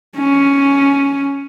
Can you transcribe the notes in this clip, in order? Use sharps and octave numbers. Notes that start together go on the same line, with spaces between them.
C#4